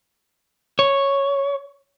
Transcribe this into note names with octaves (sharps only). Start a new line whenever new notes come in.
C#5